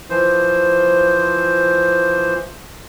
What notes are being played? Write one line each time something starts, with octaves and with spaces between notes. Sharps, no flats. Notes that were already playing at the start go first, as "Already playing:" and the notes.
E3 F3 C5